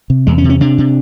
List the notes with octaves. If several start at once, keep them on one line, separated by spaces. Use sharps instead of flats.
C3
E2 G#3
C#4
C3
C#4
C3 D4
C3